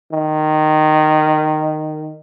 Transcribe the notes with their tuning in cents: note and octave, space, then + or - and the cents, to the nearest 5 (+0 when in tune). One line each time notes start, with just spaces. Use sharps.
D#3 -15